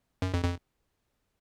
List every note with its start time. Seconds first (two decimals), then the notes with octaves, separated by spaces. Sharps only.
0.22 F#2
0.34 F2
0.44 F2